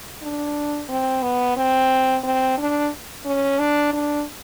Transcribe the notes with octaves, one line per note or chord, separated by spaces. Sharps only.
D4
C4
B3
C4
C4
D4
C#4
D4
D4